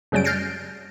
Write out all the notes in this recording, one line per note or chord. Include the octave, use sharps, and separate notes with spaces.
F#2 C#3 F#3 G3 C#4 D7
F6 G6 A6 A#6 C7 D7